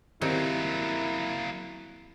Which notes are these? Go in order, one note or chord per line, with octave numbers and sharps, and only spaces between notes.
D#3 F#3 G3 A#3 C4 E4